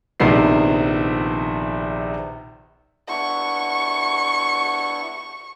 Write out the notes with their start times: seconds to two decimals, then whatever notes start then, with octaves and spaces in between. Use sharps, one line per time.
0.20 A#1 C3 D#3 F3 B3 C7
3.09 B3 D4 E4 C#6